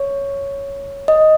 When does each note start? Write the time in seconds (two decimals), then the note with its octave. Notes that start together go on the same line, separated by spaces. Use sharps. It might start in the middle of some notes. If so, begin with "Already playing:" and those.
Already playing: C#5
1.08 D#5